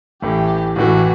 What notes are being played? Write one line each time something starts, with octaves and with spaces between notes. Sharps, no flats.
A1 A2 E3 G4
A1 A2 E3 F#4